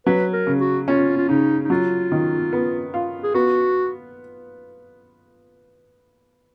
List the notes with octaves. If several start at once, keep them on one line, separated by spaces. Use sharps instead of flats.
F#3 B4
A#4
C#3
F#4
C#4 F4
F4
C#3 D#4
D#4
F#3 F4
D#3
B3
F4
G#4
B3 F#4